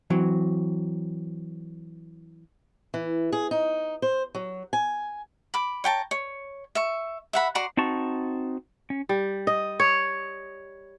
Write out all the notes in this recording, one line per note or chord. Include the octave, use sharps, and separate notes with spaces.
E3 F#3 C4
E3
G#4
D#4
C5
F#3
G#5
B5 D6
C#5 G5 A5 A#5
C#5
E5 C#6
E5 F#5 B5
F#4 D5 A#5 C6
C4 D#4 F#4 A5 C#6
C#4
G3
D#5
C#5